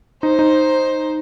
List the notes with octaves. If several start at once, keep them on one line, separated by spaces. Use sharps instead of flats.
D#4 C5
D#4